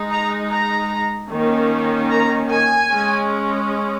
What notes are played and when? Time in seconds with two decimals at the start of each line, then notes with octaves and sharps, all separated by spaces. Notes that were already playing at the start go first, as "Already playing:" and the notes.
Already playing: G#3 D#4
0.11 A#5
0.51 A#5
1.30 D#3 A#3 C#4
2.11 A#5
2.51 G#5
2.91 G#3 C#4